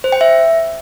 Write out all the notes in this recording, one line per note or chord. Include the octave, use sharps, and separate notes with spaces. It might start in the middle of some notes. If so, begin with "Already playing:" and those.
C5
G5
E5